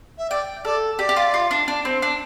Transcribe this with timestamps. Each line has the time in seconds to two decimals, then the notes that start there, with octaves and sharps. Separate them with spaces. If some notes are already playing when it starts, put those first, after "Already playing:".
0.18 E5
0.30 D5 G5
0.65 A4 D5
0.99 G4 D5
1.09 G4
1.16 F4
1.34 F4
1.51 D4
1.68 D4
1.85 C4
2.02 D4